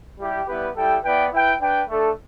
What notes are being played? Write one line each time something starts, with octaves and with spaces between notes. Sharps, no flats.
G3 E4 G4
G3 B3 E4 G4 B4
G3 E4 A4 G5
B3 E4 B4 D5 G5
E4 B4 G5
D4 B4 G5
A3 D4 A4